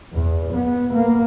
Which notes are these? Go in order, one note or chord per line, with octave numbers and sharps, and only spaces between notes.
E2
B3
A#3